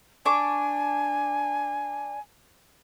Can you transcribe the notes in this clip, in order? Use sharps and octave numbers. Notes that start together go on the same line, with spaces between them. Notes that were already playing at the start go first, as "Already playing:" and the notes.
D4 G#5 C#6 D6